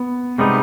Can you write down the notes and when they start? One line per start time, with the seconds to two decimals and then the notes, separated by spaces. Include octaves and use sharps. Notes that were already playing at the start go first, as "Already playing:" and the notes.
Already playing: B3
0.38 C3 G3 G#3 B3 D#4